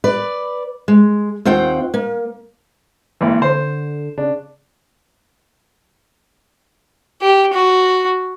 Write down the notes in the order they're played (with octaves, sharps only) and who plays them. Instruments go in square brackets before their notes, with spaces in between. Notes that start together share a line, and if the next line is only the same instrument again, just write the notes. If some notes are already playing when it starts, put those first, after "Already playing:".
[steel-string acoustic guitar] B4 D5
G#3
D#2 C4 F4 F#5 G5
A#3
[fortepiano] G#1 E3 [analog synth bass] A#3
[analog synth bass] D3 [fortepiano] C5
[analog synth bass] C#3 [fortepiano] D4
[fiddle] G4
F#4